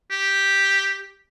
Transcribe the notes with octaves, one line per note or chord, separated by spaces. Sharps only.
G4